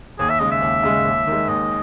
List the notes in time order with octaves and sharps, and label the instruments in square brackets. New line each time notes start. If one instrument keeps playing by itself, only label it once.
[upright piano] D#2 [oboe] G#4
[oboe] E5
[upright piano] C#3 G#3 [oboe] D#5
[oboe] E5
[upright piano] D#2
C#3 G#3
D#2
D#3 G#3
[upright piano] D#2 [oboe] D#5